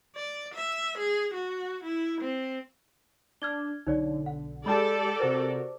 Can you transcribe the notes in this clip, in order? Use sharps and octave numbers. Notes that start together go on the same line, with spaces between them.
D5
E5
G#4
F#4
E4
C4
D4 F6 G#6 G7
B1 D3 D#4 C#5 D5
F#5
G#3 G4 A4 D5 G5 A5 B5
C3 F#4 A#4 C5